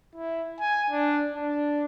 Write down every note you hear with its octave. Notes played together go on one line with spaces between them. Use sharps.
E4
G#5
D4
D4